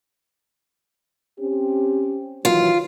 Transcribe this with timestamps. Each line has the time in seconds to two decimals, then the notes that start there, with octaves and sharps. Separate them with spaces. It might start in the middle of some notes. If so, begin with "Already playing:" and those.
1.40 C4 C#4 G4
2.45 D#3 E3 F#3 F4